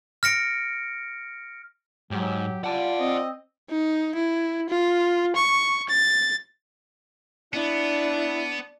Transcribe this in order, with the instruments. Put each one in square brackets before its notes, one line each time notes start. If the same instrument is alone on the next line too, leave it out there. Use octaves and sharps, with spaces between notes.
[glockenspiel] F6 A#6 C#7 D7
[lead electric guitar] G#2 [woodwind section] F#3 [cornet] G4
[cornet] G3 [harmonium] F4 D5 [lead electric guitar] F#5 A5
[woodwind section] C4 [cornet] D#5
[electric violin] D#4
E4
F4
C#6
A6
[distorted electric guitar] B3 [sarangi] D4 [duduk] E4